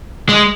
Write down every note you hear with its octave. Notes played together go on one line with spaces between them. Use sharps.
G#3